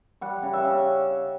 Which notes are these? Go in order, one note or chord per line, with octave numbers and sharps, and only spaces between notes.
G3 F#5
C#3
E5
C#3